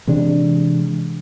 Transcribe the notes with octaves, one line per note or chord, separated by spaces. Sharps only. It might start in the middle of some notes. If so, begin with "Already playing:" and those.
C3 E3 G#3 D4